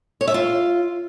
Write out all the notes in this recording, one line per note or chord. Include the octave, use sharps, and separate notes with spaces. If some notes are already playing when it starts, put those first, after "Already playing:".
C#5
E5
F4